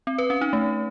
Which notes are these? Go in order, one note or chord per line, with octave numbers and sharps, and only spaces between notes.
C4
B4
C#4
D#4
A3